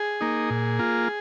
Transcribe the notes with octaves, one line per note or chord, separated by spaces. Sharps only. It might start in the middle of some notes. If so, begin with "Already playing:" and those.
Already playing: G#4
A#3 D#4
A#2
A#3 F4